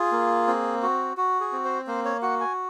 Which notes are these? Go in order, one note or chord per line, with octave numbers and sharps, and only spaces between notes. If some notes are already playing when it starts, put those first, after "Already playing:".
Already playing: F4 G#4
A#3
C4
F#4
F#4
G#4
C4
C5
A#3 C5
C#5
F#4 F#5
G#5